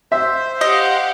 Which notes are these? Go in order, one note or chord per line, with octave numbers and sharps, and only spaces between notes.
C5 E5
G4 D#5 F5 F#5